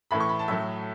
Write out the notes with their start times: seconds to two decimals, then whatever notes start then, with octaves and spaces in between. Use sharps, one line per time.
0.11 A2 E3 A3 B5
0.20 C#6
0.29 B5
0.39 A5
0.48 A2 F#3 A3 E5